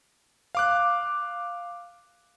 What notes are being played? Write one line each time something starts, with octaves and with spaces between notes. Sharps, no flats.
F5 D6 F#6